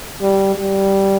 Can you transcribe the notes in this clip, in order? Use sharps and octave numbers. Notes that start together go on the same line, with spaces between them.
G3
G3